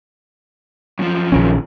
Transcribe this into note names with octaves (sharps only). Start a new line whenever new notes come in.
F#2 F3
A#1 D#3 C#4